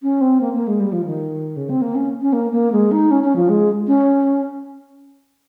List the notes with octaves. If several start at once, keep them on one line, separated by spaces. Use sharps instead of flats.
C#4
C4
A#3
A#3
G#3
G3
F3
D#3
C#3
C4
A#3
C#4
C#4
A#3
A#3
G#3
D#4
C#4
C#4
F3
G#3
C#4